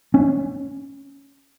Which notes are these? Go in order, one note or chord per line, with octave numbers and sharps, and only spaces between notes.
C#4